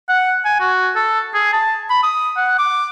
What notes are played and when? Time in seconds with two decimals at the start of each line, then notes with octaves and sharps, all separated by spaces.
0.09 F#5
0.45 G#5
0.60 F#4
0.96 A4
1.34 G#4
1.53 A5
1.90 B5
2.03 D#6
2.37 F#5
2.59 D6